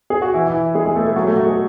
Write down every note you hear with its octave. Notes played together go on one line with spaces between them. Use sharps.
G#4
F#4
E3 E4
E3 E4
G#3 G#4
G#3 G#4
A3 A4
A3 A4
F#3 F#4
A3 A4
F#3 F#4
G#3 G#4